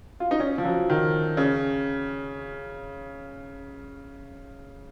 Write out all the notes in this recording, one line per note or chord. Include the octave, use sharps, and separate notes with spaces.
F4
D#4
C#4
F3
F#3
D#3
C#3